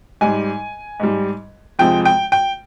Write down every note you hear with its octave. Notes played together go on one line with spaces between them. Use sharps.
G#2 G3 G#5
G#2 G3
F2 C3 F3 G#3 G5
G5
G5